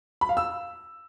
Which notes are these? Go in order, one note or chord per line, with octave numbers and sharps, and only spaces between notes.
B5
F5
E6